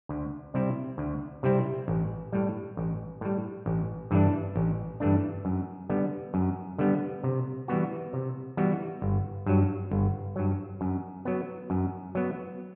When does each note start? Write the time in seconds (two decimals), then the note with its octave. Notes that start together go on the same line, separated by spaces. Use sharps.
0.09 D2
0.54 C3 G3 C4 E4
0.98 D2
1.43 C3 G3 C4 E4
1.88 A1
2.32 A2 G3
2.77 A1
3.21 A2 G3
3.66 A1
4.11 G2 E3 A3 D4
4.56 A1
5.00 G2 E3 A3 D4
5.45 F#2
5.90 D3 G3 B3
6.34 F#2
6.78 D3 G3 B3
7.24 C3
7.68 E3 G3 B3 F#4
8.13 C3
8.57 E3 G3 B3 F#4
9.02 G1
9.46 G2 F#3
9.91 G1
10.36 G2 F#3
10.81 F#2
11.25 F#3 B3
11.70 F#2
12.15 F#3 B3